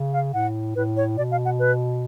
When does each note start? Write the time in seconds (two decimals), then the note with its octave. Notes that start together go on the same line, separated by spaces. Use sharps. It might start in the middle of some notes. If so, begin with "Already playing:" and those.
Already playing: C#3
0.13 F5
0.34 A2 F#5
0.76 A2 B4
0.97 C#5
1.17 B2 D5
1.31 F5
1.45 F#5
1.59 B4